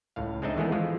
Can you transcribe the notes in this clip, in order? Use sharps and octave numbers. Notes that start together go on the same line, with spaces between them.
C#2 A2 F5
G#3 C4 D4 D#4 D#5 E5
D#3 E3 G#3 A3 B3 G#4
E3 F3 G#3 F4